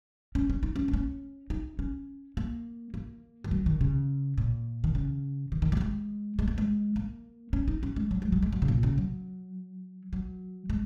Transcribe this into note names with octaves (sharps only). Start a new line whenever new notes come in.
C#4
C#4
D#4
C#4
A#3
C#4
D#4
C#4
A#3
A#3
D#3
F#3
D#3
C#3
A#2
D#3
C#3
D#3
D#3
F#3
A#3
G#3
G#3
A#3
G#3
A#3
C#4
D#4
C#4
G#3
F#3
G#3
F#3
G#3
F#3
C#3
A#2
C#3
F#3
F#3
G#3